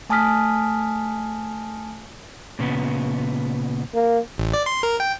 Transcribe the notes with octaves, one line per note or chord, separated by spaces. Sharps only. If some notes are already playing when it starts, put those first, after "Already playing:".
A3 G#5 A5 D#6 F6 B6
A#2 C#3 B3
A#3
A1
D5
C6
A#4
G5